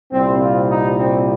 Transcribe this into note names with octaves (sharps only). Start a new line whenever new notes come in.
C2 A#2 G3 C4
F4
D#4
C4